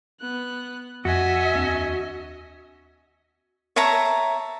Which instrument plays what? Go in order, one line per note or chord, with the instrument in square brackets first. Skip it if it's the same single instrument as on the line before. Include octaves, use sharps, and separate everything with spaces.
[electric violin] B3 F#6
[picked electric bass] F2 [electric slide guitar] F#4 [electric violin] D#5 G#5 [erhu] E5
[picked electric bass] D#2 C4 D4
[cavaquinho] C#5 E5 A5 A#5